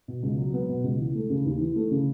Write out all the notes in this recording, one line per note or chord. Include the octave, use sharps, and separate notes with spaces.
B2
C#2
F#3
B3
B2
C#2
E3
A3
C#3
D#2
E3
A3
C#3